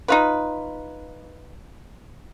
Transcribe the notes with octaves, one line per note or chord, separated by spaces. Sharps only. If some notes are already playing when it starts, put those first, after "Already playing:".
D#4 F4 B4